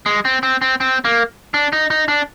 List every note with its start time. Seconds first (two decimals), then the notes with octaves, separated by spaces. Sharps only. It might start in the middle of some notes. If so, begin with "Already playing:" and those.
0.06 G#3
0.25 C4
0.43 C4
0.62 C4
0.80 C4
1.05 A#3
1.54 D4
1.73 D#4
1.90 D#4
2.08 D4